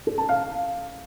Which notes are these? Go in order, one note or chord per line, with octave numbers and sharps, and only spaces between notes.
A4
A5
F5